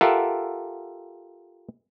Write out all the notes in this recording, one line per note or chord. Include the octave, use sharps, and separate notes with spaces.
F4 G4 A4 A#4 E5 F#5